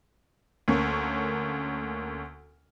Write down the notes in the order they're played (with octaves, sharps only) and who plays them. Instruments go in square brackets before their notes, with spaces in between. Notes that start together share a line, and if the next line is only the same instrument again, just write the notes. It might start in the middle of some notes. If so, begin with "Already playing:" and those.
[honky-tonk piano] D2 A#3 C#4